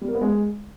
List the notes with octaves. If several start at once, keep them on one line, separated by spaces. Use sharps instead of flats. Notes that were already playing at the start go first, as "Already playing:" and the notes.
G3
A#4
B3
G#3